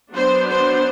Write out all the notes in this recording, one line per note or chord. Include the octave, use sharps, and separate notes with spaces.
F#3 B3 D4 C5
C5